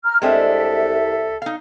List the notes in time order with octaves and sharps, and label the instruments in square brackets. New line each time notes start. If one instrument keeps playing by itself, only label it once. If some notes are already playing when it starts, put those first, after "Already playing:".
[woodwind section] A#5 F6
[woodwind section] C2 E5 [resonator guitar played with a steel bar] G#3 C4 D4 [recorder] A4
[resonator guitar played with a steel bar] D#4 F5